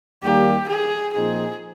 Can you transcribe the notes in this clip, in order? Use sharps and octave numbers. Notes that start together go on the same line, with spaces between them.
D#2 D#3 G3 A#3 G4
G#4
A#2 F3 C4 D#4 G#4